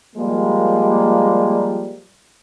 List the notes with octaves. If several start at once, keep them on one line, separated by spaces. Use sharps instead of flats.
F3 G3 G#3 A#3